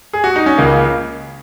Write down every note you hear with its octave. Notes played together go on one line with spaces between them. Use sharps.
G#4
F#4
D#4
C#4
C#2 C#3 A#3